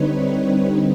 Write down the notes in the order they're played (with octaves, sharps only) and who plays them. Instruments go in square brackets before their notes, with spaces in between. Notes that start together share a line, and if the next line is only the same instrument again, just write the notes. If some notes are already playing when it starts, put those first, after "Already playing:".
Already playing: [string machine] D3 G3 C4 D#4 B4 C#5